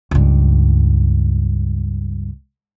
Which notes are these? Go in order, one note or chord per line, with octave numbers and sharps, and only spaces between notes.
C#2 G2